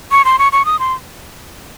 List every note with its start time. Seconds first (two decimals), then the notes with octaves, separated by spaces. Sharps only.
0.11 C#6
0.25 C6
0.39 C#6
0.52 C#6
0.66 D#6
0.79 C6